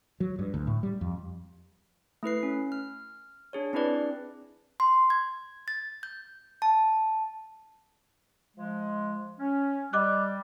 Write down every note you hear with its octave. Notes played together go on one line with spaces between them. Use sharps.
F#3
G2
D2
A2
G3
F2
A3 E4 B4 C7
C#4
F6
D4 G#4 C#5
C4 D4 E4 G#4 B4 D5
C6
G#6
A6
G6
A5
F3 G#3
C#4
G3 D#5 D6 F#6